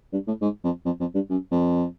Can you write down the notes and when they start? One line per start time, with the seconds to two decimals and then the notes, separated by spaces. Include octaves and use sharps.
0.13 G2
0.27 A2
0.42 G#2
0.64 F2
0.86 F2
1.00 F2
1.15 G2
1.30 F#2
1.51 F2